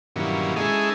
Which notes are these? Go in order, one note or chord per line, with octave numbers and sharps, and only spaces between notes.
G2 A#2 D#3 E3 F#3 C#4
G#3 C#4 D#4 E4 G#4 A4